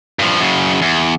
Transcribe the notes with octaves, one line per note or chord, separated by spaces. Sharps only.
G2 F3
F#2 C#3
E2